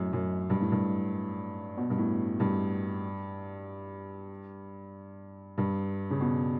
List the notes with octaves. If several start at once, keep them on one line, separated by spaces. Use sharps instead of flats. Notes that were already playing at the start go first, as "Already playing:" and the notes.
Already playing: F#2 A2
F#2
G2
A2
G2
B2
G2
A2
G2
G2
C#3
B2